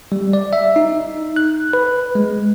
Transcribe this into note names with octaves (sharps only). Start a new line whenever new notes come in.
G3
D5
E5
D#4
F#6
B4
G#3